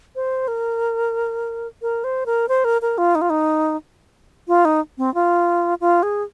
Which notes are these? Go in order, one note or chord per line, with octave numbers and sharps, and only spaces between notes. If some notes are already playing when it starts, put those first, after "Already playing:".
C5
A#4
A#4
C5
A#4
C5
A#4
A#4
F4
D#4
F4
D#4
F4
D#4
C4
F4
F4
G#4